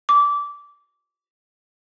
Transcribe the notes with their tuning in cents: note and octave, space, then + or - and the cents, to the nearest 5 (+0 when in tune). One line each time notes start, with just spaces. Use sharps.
D6 -20